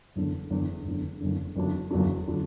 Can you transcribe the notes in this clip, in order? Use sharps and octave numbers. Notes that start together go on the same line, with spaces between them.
F#1 E2 D3
F#1 E2 D3
F#1 E2 D3
F#1 E2 D3
F#1 E2 D3 F#3 D4
F#1 E2 D3 F#3 D4
D3 F#3 D4